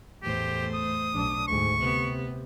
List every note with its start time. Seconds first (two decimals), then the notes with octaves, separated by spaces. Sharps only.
0.22 E2 A2 A3 G4 C5
0.74 D#6
1.13 B1 D4
1.47 D2 G#2 C#6
1.81 C3 B3